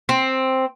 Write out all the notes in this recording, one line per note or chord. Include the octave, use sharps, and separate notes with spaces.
C4